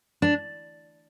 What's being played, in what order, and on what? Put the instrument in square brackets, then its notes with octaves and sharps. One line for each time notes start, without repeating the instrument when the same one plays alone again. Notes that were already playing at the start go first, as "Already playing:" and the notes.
[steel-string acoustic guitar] D4